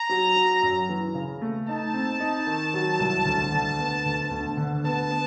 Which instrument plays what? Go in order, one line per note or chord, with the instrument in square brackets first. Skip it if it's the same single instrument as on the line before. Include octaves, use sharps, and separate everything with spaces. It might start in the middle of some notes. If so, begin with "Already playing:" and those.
Already playing: [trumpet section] A#5
[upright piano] F#3
F#3
F#2
E3
C#3
A3
[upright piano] D#4 [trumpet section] A5
[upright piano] C4
D#4
D#3
F#3
C2
D2
D3
B3
D2
D2
D3
[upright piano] B3 [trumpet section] A5
[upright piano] B3